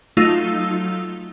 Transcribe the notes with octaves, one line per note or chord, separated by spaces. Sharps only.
F#3 A3 D#4 F4 E6